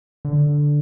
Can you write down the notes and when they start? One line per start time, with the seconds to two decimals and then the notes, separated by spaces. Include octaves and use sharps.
0.25 D3